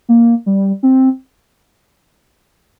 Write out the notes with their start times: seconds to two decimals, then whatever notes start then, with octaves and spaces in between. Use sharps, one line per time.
0.09 A#3
0.46 G3
0.83 C4